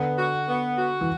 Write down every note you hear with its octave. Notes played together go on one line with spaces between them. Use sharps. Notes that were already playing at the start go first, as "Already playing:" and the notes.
Already playing: D3 B3
F#4
B3
F#4
E3